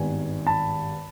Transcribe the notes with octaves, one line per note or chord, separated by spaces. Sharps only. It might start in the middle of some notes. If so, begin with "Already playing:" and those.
Already playing: G#1 G2 D#3 G3 B3 G#5
A5 B5